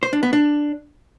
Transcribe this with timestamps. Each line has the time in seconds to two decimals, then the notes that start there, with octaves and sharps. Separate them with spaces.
0.03 C5
0.13 D4
0.23 B3
0.33 D4